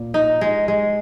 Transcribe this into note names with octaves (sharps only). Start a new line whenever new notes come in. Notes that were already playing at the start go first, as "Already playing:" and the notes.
Already playing: A#2
D#4
G#3
G#3